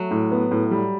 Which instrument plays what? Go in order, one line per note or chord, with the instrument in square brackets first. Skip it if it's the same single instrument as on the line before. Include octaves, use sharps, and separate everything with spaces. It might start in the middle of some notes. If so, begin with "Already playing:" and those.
Already playing: [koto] F#3 A3
[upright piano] A2
B3
A2
G3